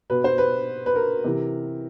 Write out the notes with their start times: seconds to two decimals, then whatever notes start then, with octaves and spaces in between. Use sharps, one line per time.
0.10 B2 B4
0.24 C5
0.38 B4
0.86 B4
0.96 A#4
1.24 C3 E3